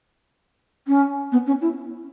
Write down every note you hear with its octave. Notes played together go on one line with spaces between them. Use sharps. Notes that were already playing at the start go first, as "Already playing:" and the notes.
C#4
B3
C#4
E4